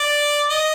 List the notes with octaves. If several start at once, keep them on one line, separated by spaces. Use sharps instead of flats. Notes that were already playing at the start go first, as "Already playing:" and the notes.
Already playing: D5
D#5